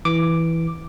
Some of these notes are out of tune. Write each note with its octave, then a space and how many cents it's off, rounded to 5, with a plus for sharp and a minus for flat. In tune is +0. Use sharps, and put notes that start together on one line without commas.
E3 -5 D6 +0